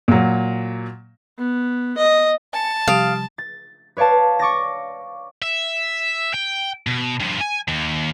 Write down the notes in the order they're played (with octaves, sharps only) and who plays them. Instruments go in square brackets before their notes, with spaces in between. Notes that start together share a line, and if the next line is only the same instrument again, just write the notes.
[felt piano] A#2 F#3
[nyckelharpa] B3
D#5
[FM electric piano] G#5 C#7 [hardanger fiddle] A5
[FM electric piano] C3 F3 G3 [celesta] G4 D#6 D7 [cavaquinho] F5
[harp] A6
B4 C#5 D5 F5 A5
C#6 D6 A6 A#6
[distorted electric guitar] E5
G5
B2
G2 F3
G#5
D#2